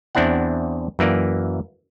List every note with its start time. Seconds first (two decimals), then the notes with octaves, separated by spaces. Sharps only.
0.15 E2 C4 D4 E4 F#5
0.99 F#2 E3 A#3 D5